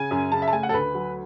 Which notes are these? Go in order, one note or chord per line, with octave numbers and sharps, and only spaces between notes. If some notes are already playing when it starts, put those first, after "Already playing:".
Already playing: C#3 G#5
F#2
C#3 A5
E5
A5
A3 G#5
F#5
A4
D2 B4
F#3